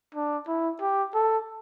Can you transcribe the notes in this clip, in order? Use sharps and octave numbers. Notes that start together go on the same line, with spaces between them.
D4
E4
G4
A4